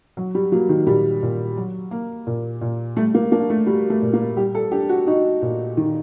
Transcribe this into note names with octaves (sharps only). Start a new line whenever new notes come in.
F#3
G3
F#3 A#3
D#3
A#2 G3
A#2
F#3
A#3
A#2
A#2
G3 A3
A#3
A#3 D4
A3
G3 F#4
A3
A#2
A#3
G3 G4
A4
D4 G4
F#4
D#4 F#4
A#2
D#3